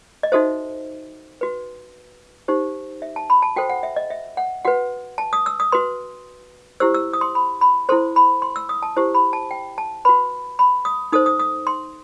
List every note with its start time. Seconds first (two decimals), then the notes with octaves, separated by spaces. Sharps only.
0.23 D#5
0.32 D#4 F#4 A4 C5 E5
1.41 F#4 B4
2.48 D#4 G4 C5
3.02 E5
3.16 A5
3.30 B5
3.42 A5
3.56 F#4 A4 C5 G5
3.69 F#5
3.83 E5
3.96 D#5
4.10 E5
4.37 F#5
4.65 F#4 B4 F#5
5.18 A5
5.33 D#6
5.46 E6
5.60 D#6
5.72 F#4 B4 C6
6.80 E4 G4 C5 E6
6.94 E6
7.13 D#6
7.21 C6
7.35 B5
7.61 B5
7.89 E4 A4 C5 C6
8.16 B5
8.42 C6
8.56 E6
8.69 D#6
8.83 A5
8.96 E4 G4 C5
9.15 B5
9.33 A5
9.51 G5
9.78 A5
10.05 F#4 B4 B5
10.59 B5
10.85 D#6
11.12 D#4 A4 C5 D#6
11.26 D#6
11.40 D#6
11.67 C6